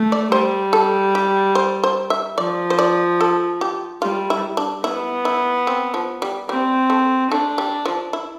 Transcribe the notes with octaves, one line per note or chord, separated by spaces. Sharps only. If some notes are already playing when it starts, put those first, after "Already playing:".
Already playing: A3
D5
G3 C5
A4
G4
C5
C5
E5
F3 D5
C5
D5
A4
G4
G3 F4
E4
D4
B3 E4
E4
C4
F3
G3
G3 C4
A3
A3 D4
G3
F3
E4